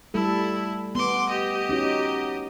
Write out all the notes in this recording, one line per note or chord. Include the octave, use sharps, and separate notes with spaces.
G3 A3 E4 A4
B3 C6 D6
G4 D#5
C#4 D#4 F#4